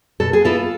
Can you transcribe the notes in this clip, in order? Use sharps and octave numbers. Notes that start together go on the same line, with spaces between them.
B2 A4
G#4
B3 E4 F4 A4